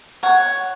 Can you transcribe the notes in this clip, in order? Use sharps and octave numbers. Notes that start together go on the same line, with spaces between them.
C#5 F#5